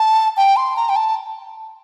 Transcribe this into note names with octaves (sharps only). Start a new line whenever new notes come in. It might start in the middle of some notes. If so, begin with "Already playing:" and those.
Already playing: A5
G5
C6
A#5
G5
A5